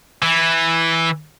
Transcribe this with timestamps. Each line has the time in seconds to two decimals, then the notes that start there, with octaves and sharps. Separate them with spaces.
0.22 E3